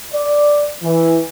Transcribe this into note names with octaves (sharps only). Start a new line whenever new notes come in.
D5
E3